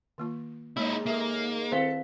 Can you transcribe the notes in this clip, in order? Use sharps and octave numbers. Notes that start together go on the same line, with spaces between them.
D#3 A#3 F4
D#2 G#2 G#3 A#3 D#4 E4 C#5
A#3 G#4 A4 E5
D#3 C4 E4 A4 C5 F5